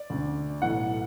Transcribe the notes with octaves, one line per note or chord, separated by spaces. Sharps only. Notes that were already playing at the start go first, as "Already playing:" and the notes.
Already playing: D5
D2 D3
B1 A2 E3 F#5